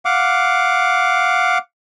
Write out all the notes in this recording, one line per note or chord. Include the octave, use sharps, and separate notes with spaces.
F5 F#5 D6